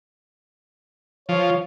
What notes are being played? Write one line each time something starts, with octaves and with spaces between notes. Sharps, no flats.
F3 C#5